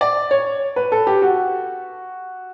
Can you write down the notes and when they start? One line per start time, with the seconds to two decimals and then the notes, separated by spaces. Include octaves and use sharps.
0.01 D5
0.31 C#5
0.76 B4
0.92 A4
1.07 G4
1.22 F#4